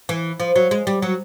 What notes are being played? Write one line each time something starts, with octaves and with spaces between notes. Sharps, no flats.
E3
F3
F#3
G#3
G3
F#3